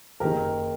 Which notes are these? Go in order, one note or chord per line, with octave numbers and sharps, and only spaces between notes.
F#1 D#3 G4 A#4